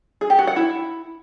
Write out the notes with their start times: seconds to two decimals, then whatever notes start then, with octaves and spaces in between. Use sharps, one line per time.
0.21 G#4
0.30 G4
0.39 F#4
0.47 F#5
0.56 E4